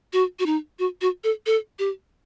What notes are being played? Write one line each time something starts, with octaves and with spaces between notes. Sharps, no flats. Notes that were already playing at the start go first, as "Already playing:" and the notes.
F#4
F#4
D#4
F#4
F#4
A4
A4
G4